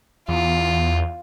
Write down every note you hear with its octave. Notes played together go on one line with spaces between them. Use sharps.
E2 F4